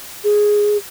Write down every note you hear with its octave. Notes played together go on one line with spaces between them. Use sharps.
G#4